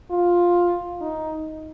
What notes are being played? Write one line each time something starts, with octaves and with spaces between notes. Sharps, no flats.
F4
D#4